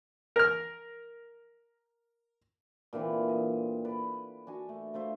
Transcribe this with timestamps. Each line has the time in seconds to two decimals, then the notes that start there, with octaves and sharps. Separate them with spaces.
0.36 A#4 F6
2.93 A#2 D3 E3 C4
3.29 D#5
3.85 B4 D5
4.47 D4 F#4 G#5
4.69 A3
4.94 A3 F4 C5 E5